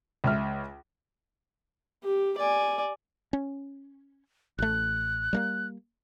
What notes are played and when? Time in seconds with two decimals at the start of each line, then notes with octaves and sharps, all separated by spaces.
0.24 C#2 E5 F6
2.04 G4
2.38 D5 G#5
3.33 C#4
4.59 A1 A3 F#6
5.33 G3 A3 A#3